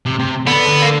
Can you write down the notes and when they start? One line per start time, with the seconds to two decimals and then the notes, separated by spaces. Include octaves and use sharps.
0.06 C3
0.19 C3
0.47 D3 B3
0.68 D3
0.82 A#3